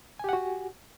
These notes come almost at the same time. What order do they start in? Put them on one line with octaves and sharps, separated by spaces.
G#5 G4 F#5 F#4